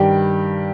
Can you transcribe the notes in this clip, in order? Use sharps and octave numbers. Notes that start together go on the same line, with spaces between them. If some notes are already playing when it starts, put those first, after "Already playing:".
Already playing: G2 D#3 G3 G4